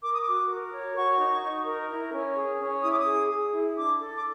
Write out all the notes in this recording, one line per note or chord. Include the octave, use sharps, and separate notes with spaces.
A#4 D6
D#6
D6
F#4
A#4
C#5
F#4 C#6
D#4
D#4
A#4
E4
C#4
G#4
C#4
E4 D#6
D6
D#6
G#4
G#4
E4
D4 D6
A4
D6